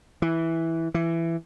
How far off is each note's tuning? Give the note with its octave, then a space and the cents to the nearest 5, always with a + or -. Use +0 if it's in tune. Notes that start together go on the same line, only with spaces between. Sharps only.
E3 -5
E3 +15